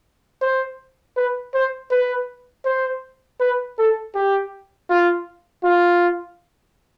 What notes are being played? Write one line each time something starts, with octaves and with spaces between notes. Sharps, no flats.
C5
B4
C5
B4
C5
B4
A4
G4
F4
F4